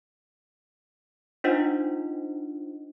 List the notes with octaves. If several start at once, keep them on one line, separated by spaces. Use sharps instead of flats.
D4 D#4 F4 C5 D#5 F#5